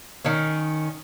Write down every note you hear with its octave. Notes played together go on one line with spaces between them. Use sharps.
D#3 C#4